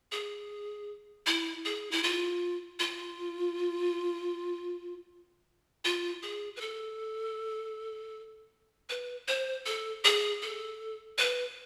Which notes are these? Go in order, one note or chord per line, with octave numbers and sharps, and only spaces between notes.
G#4
E4
G#4
E4
F4
F4
F4
G#4
B4
A4
B4
C5
A4
G#4
A4
B4